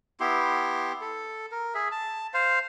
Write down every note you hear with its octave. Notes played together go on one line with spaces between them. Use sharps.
B3 E4 G4 C6
A4
A#4
G#4 E5
A5
C5 F5